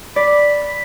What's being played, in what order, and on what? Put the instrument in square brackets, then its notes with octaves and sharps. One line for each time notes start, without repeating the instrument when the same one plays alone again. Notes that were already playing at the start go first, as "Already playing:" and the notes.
[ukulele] D5 [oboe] B5